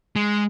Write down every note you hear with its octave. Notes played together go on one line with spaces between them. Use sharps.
G#3